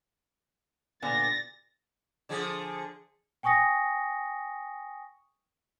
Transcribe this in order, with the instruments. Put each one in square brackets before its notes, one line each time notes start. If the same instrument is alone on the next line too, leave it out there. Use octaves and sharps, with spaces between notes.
[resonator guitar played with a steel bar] A#2 D3 B3 [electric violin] A6 A#6
[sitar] D3 F3 G#4
[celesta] G5 G#5 C#6 D#6 A#6 C#7